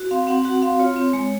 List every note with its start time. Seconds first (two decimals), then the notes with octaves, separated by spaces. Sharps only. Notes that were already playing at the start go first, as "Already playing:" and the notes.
Already playing: F#4
0.11 C4 F5
0.27 C4 F#5
0.45 F#4 F#5
0.62 C4 F5
0.79 F4 C#5
0.96 C4
1.13 G#3